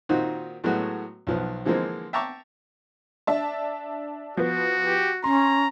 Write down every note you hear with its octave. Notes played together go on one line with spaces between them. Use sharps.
A#2 D#3 C4 D#4 F#4
A2 F#3 G#3 A3 B3 F#4
B1 F3 B3
D3 E3 F3 G#3 A#3 C4
E5 G5 A5 A#5 C#6 D6
D4 E5 A5
F3 B3 F#4
G4
C#4 A#5 C6